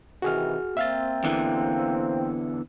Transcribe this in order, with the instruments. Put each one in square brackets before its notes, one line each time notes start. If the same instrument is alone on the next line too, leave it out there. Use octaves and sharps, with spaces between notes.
[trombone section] C3 D#3 E3 [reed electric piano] F#4 G#4 F6
[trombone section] A#3 C4 [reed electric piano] E5 F5 A6
[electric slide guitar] E2 D3 E3